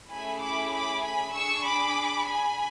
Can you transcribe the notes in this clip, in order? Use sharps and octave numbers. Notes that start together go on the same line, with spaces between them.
A3 C#4 E4 G#4 G#5 B5
B5 D6
B5 D6
G#5 B5
D4 G#4 C#6 E6
B5 D6
G#5 B5